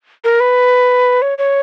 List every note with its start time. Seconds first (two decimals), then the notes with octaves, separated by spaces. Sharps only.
0.24 A#4
0.40 B4
1.22 C#5
1.38 C#5